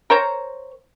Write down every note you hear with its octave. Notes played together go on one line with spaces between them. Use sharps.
A#4 C5 C#5 A#5